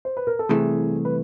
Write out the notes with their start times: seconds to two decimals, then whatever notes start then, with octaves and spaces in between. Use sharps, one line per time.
0.05 C5
0.17 B4
0.27 A#4
0.39 A4
0.49 C2 C3 E3 A3 G#4
1.05 B4